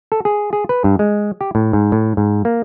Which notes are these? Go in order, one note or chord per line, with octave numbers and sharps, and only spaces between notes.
A4
G#4
G#4
B4
G2
G#3
G4
A2
G#2
A2
G#2
A#3